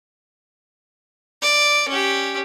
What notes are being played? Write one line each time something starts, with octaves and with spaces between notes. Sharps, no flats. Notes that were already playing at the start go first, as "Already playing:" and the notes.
D5
C#4 G4